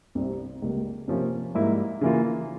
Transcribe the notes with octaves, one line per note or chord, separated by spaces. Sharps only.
C2 C3 G3 C4
C#2 C#3 G3 A#3
C3 F3 A#3 C#4
G#2 G3 A#3 E4 G4
C#3 E3 A#3 F4